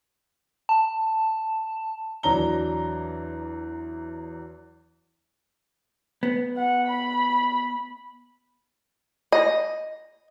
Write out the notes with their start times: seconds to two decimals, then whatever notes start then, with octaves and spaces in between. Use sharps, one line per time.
0.69 A5
2.23 E2 F#3 D4 A#5 G7
6.23 B3
6.57 F#5
6.87 B5
9.32 D#5